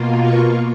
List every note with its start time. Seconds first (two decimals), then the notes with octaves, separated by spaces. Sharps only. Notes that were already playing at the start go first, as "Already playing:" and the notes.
Already playing: B2 A#3 F4
0.21 C#6